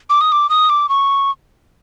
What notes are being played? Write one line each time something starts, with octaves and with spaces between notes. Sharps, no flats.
D6
D#6
D6
D#6
D6
C#6